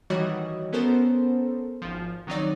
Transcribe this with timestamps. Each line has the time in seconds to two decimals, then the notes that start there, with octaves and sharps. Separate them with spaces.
0.10 D#3 E3 G3 F#4 C#5 D#5
0.73 B3 C#4 A4 A#4 C5
1.82 G#1 F3
2.27 D#3 F#3 C4 D#4 C#5 D5